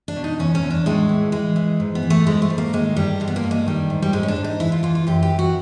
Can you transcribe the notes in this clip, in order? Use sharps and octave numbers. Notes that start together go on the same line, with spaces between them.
D4
B2
D#4
E2 C#4
C#4
E2
D4
A2 G#3
E3
E3 G#3
E3
G#2
B3
E3
A3
G#2 G#3
A3
G#2
A#3
D#3 G#3
G2 G3
G2 G#3
B3
A#3
G2
G#3
D#3 G3
G#2
G3
G#2 G#3
C#4
D4
G#2
D#4
E3 E4
F4
E3 F4
F4
F#2 G4
G4
E3
F#4